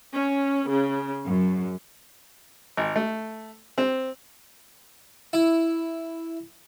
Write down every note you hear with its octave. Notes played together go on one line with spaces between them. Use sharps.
C#4
C#3
F#2
G#1
A3
C4
E4